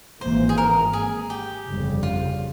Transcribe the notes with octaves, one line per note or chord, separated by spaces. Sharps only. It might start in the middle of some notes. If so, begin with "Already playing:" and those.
G#1 G#2 E3 A#3 C5
G#4
A#4
G#4
G4
G1 F2 C#3 G3
F4